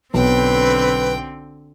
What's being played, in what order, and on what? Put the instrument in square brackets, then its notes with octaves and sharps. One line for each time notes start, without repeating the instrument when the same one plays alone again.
[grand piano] B1 [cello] D3 C4 [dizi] B4 [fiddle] G5